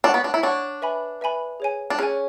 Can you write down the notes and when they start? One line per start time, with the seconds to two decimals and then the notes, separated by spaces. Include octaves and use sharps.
0.04 D4 C#5 F#5 C#6 E6
0.14 B3
0.24 D4
0.34 E4
0.43 D4 C#5 F#5 C#6 E6
0.82 B4 E5 G#5 B5
1.21 B4 E5 G#5 B5
1.60 G#4 C#5 G#5
1.90 D4
1.99 C#4 G#4 C#5 G#5